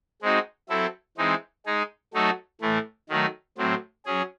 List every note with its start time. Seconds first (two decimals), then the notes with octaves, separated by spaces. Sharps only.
0.22 G#3 C4 D#4 F#4
0.69 F#3 C4 E4 A4
1.18 E3 G#3 C4 D#4
1.66 G#3 D#4 G#4
2.13 F#3 A3 D#4 F#4 A4
2.61 A2 E3 A3
3.09 D#3 F#3 A3 D#4
3.58 A2 F#3 C4
4.05 F#3 C#4 G#4